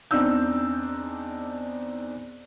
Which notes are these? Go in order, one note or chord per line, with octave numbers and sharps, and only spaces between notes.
E2 C4 D4 D#4 E6 G6